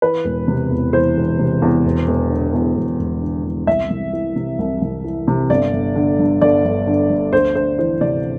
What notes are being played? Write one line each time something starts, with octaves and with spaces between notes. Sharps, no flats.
E3 B4
E1
C3
E2
E3 C5
E1
C3
E2
E1
E1
D3
E2
E1
E1
D3
E2
C2 E5
C2
E3
C3
C2
C2
E3
C3
G1 D5
G1
D3
G2
G1 D5
G1
D3
G2
D2 C5
D2 C5
E3 C5
C3 D5